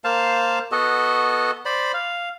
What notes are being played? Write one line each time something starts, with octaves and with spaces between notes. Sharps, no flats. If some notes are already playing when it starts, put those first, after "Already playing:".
A#3 C5 F5 A5
B3 F#4 A4 D#5
C5 D5 B5
F5